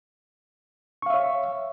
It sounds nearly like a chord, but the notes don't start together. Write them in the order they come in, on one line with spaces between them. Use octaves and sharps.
C#6 F5 E5 C#5